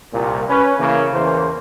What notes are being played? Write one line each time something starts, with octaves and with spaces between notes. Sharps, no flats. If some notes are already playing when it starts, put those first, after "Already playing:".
C2 A#2
C#4 B4
C#3 E3 A#3
E2 C#3 E3 A#3 C5